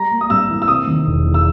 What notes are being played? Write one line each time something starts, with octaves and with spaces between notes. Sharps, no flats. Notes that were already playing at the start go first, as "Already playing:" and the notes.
Already playing: G3 A#5
A#3
D#6
G2 E6
E3
E6
C3 D#6
D#3
E1
E2
E6